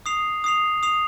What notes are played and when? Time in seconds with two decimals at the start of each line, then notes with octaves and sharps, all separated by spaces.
0.06 D#6 C7 F7
0.44 D#6 C7 F7
0.83 D#6 C7 F7